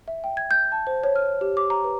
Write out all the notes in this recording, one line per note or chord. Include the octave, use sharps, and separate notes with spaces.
E5
G5
G#6
G6
A5
C5
C#5
F6
G4
D6
A#5
B4